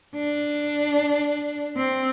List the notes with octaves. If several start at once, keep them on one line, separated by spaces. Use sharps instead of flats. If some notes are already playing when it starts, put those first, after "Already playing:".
D4
C4